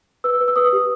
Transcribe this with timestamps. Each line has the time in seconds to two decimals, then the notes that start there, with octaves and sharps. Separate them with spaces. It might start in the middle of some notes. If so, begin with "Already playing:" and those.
0.24 B4 E6
0.40 B4
0.48 E6
0.56 B4 D#6
0.73 G4